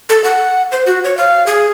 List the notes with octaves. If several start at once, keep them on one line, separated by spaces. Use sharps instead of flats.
A4
F#5
C5
F#4
C#5
F5
G#4